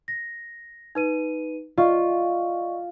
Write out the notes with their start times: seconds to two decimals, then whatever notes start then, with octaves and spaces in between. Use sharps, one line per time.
0.08 A#6
0.95 D#4 B4 D#7
1.78 F4 D5 D#5 C#6